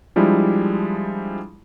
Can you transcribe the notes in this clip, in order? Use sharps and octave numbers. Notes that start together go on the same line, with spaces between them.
F3 G3 G#3 D4 E4